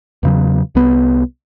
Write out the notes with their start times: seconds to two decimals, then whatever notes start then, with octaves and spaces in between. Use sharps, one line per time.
0.23 E2 C#3 F#3
0.75 C2 B3